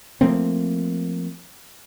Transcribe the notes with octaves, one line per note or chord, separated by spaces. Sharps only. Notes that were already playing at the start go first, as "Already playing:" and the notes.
F3 A3 A#3 C4